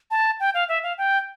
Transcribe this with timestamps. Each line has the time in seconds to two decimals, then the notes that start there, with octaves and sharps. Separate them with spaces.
0.11 A5
0.40 G5
0.54 F5
0.69 E5
0.83 F5
0.98 G5